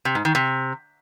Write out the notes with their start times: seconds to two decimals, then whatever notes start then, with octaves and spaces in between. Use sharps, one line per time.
0.05 C3
0.15 G#2
0.25 D#3
0.35 C3